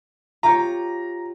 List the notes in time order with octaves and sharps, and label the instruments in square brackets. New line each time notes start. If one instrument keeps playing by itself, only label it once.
[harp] F4 G4 C#5 [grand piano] A#5